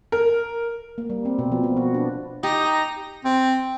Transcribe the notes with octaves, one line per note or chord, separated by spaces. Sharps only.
A#4
A#3
G3
C4
B2
F3
B3
F#4
D4
D#4 G4 A#5 D#6
C4